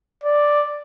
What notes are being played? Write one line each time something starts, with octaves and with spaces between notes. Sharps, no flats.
D5